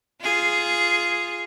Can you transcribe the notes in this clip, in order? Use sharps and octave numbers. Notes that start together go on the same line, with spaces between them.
F4 G#4